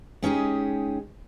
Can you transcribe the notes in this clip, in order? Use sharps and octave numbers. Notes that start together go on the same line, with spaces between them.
G#3 C#4 D#4 G4 G#4